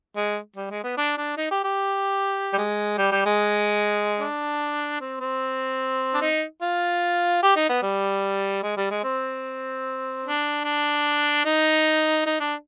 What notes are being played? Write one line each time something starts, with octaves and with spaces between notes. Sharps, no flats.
G#3
G3
G#3
B3
D4
D4
D#4
G4
G4
G3
G#3
G3
G3
G#3
D4
C4
C4
D4
D#4
F4
G4
D#4
B3
G3
G#3
G3
G#3
C4
D4
D4
D#4
D#4
D4